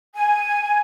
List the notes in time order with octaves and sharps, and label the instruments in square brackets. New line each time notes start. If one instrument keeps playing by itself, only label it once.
[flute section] G#5